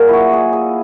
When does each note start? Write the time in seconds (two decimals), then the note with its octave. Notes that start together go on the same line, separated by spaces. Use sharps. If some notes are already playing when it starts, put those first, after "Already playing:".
Already playing: A#2 F#3 G#4 A#4
0.09 E4 F#4
0.33 G#4
0.53 G#4